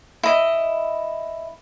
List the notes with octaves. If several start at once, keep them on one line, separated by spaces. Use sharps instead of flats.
E4 D#5